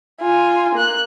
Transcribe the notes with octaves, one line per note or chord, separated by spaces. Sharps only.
F4 G#5
A#3 F#6